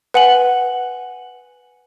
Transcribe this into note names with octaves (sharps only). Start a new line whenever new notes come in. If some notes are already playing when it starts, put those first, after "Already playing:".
B4 F#5 G#5 F#7